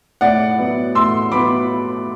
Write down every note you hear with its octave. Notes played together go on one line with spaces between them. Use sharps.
A2 D5 F#5
F#3 B3
A2 C6 E6
F#3 B3 B5 D6